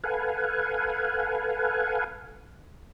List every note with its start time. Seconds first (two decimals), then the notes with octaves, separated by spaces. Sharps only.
0.04 A4 B4 F5 F#5 G#5